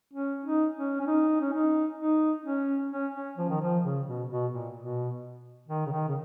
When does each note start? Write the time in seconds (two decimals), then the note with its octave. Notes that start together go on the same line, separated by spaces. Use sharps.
0.13 C#4
0.45 D#4
0.76 C#4
1.01 C#4
1.07 D#4
1.41 C#4
1.53 D#4
1.98 D#4
2.44 C#4
2.91 C#4
3.15 C#4
3.38 F3
3.50 D#3
3.61 F3
3.84 C#3
4.07 B2
4.30 B2
4.53 A#2
4.76 B2
5.68 D#3
5.86 C#3
5.92 D#3
6.09 C#3